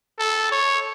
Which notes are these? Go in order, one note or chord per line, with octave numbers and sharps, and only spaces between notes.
A4
C#5